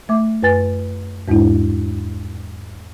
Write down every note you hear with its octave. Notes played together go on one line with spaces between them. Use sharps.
A3 E5 D6
F#2 B4 G#5 A6
E2 G#2 G#3 D4 E4